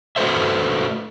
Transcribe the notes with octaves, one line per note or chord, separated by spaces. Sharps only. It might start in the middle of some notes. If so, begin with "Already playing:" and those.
A3 F#4 A4 B4 C5 E5